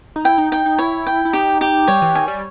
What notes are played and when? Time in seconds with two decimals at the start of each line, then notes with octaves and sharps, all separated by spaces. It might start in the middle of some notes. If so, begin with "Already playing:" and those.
0.16 D#4
0.24 E4 G5
0.38 D#4
0.52 D#4 G5
0.66 D#4
0.78 E4 C#5
1.07 G5
1.25 E4
1.33 D#4 G4
1.61 G4
1.88 G3 C#5
2.02 E3
2.15 D#3 G#5
2.28 G3